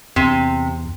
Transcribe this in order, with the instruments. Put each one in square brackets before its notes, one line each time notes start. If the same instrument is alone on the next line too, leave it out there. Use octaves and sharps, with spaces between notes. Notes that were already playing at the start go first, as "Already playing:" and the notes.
[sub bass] E2 [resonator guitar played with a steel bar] C3